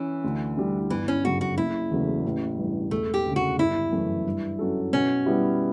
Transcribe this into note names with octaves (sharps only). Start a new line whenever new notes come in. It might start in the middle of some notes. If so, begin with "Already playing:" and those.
Already playing: E3 C#4
D2
D3 G3
G1 E3
C#4
F#2 C#3 F#4
F#4
F#1 E4
E2 C#3 F#3 A3
A1
G2 E3
E1 A3
G4
D2 C#3
F#4
G1 E4
F#2 E3 A3
G2
F#3 C#4 F#4 A4
B2 C#4
G3 B3 E4 G4